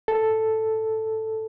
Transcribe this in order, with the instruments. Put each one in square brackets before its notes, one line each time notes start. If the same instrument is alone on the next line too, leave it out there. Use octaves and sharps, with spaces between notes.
[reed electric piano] A4